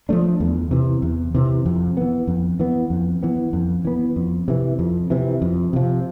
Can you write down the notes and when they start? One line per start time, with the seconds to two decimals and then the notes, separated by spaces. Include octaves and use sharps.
0.09 F3 A3 D4
0.40 E2
0.71 C3 E3
1.02 E2
1.35 C3 E3
1.66 F2
1.97 E3 B3
2.27 F2
2.59 E3 B3
2.90 F2
3.23 E3 B3
3.53 F2
3.85 E3 B3
4.16 F2
4.48 C3 E3
4.79 F2
5.10 C3 E3
5.42 F2
5.73 C3 F3